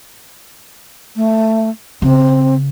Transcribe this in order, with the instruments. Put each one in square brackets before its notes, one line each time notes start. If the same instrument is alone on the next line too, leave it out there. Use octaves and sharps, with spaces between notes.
[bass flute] A3
[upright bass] C#3 [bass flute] C4